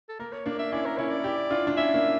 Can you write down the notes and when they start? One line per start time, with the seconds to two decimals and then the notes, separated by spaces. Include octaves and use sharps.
0.09 A4
0.19 A#3 A#4
0.32 C#5
0.46 A#3 D4 D5
0.59 E5
0.72 C#4 E4 D5
0.85 A#4
0.98 C#4 E4 C#5
1.11 D5
1.24 E4 G4
1.50 D4 F4
1.67 D4
1.76 C#4 E4 E5
1.94 A#3 D4